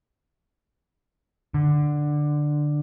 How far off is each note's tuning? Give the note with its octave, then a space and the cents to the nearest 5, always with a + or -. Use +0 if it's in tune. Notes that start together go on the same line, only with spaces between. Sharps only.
D3 +10